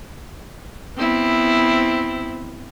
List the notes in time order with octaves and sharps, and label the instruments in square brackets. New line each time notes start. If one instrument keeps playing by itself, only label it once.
[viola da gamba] B3 C4 E4